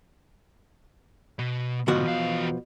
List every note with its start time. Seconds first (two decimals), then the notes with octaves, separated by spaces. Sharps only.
1.39 B2
1.88 D2 G#2 B2 F3 F#4
2.04 E2 F5